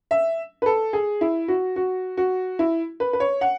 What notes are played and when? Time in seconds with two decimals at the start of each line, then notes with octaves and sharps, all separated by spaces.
0.11 E5
0.62 B4
0.66 A4
0.93 G#4
1.21 E4
1.48 F#4
1.76 F#4
2.17 F#4
2.59 E4
3.00 B4
3.13 B4
3.20 C#5
3.41 F#5